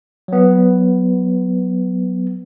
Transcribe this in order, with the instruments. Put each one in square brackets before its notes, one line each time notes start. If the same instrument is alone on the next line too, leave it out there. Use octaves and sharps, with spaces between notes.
[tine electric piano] F#3 B3